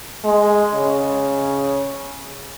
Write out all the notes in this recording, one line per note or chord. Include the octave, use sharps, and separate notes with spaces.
G#3
C#3